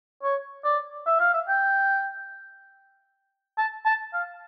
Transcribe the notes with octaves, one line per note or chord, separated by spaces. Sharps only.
C#5
D5
E5
F5
E5
G5
A5
A5
F5